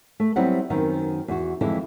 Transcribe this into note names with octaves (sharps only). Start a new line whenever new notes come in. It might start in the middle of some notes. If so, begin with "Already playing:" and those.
A3
F#3 G3 B3 C4 E4 F#5
F#2 D#3 B3 C4
E2 F#4
F2 D3 E3 G#3 E4